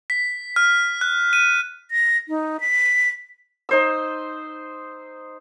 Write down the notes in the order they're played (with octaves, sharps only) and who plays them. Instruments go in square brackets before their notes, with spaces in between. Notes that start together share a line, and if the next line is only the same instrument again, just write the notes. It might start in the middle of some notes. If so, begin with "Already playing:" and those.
[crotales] B6
F6
F#6
D#7
[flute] A#6
D#4
B6
[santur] D#4 C5 E6